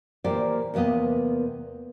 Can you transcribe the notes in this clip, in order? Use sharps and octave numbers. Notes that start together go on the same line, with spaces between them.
A#2 E3 A#3 G4 C5 D5
E2 C3 A#3 B3 D#5